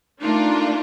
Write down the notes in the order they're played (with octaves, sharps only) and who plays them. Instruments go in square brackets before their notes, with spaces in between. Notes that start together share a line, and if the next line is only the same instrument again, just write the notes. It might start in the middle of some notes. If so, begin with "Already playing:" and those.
[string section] A3 D4 F4 A#4 [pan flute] D#4